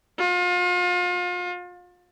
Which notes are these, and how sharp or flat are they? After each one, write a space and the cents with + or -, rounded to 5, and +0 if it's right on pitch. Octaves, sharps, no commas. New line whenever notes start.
F4 +35